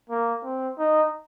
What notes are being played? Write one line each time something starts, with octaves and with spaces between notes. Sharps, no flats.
A#3
C4
D#4